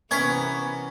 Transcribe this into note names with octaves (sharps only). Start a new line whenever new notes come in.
C3 E3 B3 C#4 A#4 G#6 B6